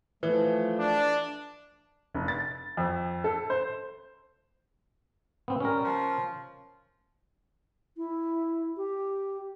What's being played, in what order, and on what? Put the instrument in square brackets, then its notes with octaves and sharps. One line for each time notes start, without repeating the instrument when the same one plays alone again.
[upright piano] E3 [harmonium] F3 A3
[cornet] D4
[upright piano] F1
A6
F2
A4
C5
[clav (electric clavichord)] B3 C4
[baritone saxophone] G3 [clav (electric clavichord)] C#4 A#4
[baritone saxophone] F3
[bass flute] E4
G4